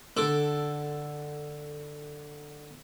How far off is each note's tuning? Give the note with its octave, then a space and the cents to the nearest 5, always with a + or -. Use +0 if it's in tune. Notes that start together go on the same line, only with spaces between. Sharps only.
D3 +10 A4 +0 D6 +0